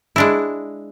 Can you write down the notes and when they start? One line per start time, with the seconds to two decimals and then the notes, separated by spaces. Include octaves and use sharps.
0.16 G#3 D4 E4